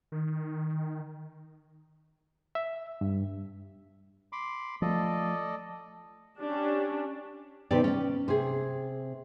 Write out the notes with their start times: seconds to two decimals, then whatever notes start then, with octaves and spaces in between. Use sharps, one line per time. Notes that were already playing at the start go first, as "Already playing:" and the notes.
0.12 D#3
2.55 E5
3.01 G2
4.32 B5 C6 D6
4.82 F3 A3 A4 D5 D#5
6.41 C#4 D4 G4
7.71 C3 D#3 B3 G4 D5
7.84 C#4 D5
8.28 C3 G#4